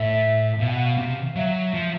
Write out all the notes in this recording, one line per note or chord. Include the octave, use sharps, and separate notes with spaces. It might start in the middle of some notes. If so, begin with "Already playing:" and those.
Already playing: A2 E5
B2 F5
G5
F#5
F5
C3
F#3 E5
F3